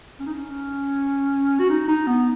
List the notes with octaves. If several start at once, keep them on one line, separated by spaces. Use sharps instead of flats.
C#4
D#4
C#4
F#4
D#4
D#4
B3